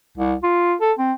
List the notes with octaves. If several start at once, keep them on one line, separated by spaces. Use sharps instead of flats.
C2
F4
A4
C4